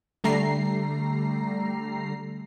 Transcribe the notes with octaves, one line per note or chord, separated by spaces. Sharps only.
D3 G3 A3 A#5 C7